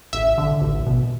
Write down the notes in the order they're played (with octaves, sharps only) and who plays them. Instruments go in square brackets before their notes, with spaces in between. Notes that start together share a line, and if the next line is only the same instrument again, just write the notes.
[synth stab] A1 E5
D3
A1
B2